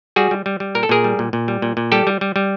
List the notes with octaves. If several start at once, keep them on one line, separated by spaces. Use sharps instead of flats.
G3 F#4 G#4
G3
G3
G3
A#2 A#4
A4
A#2 G#4 A#4
G3
A#2
A#2
G3
A#2
A#2
G3 G4 A4
G3
G3
G3